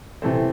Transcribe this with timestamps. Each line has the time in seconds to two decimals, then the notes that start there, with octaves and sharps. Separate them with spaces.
0.22 C3 E3 A3 C4